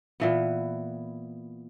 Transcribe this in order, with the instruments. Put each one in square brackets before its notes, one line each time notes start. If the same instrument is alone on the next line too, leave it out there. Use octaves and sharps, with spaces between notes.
[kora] A#2 E3 B3